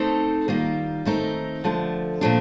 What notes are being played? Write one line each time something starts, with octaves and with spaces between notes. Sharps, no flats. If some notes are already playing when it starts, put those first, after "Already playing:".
Already playing: A3 C4 D#4 A4 C5
D#3 G3 A#3 F4
D#3 A3 C4 D#4 A#4
D3 F3 A3
A#2 F3 A3 D4